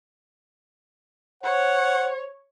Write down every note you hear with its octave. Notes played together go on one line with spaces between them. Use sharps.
C5 C#5 F#5